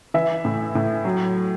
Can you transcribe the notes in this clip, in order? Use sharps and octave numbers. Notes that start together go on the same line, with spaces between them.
E3 E5
A2
A2
F#3